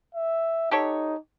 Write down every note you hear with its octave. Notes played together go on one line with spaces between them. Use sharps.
E5
D#4 G4 A4 C#5